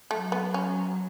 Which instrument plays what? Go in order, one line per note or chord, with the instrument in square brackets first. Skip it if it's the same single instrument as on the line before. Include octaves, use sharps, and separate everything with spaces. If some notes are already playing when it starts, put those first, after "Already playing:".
[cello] F#3 [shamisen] A3
[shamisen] B3
C#4